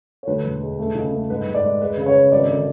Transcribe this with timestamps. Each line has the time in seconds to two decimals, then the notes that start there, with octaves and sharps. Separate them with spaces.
0.23 C#5
0.27 D2 B4
0.44 E1
0.61 G#3
0.79 A3
0.95 C#2
1.12 A3
1.30 G#2 B4
1.46 G#2
1.54 D5
1.63 G#2
1.80 G#3 B4
1.97 C#3 B4
2.06 C#5
2.15 C#3
2.32 G#1 D5
2.48 D3